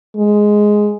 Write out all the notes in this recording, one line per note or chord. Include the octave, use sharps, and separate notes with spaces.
G#3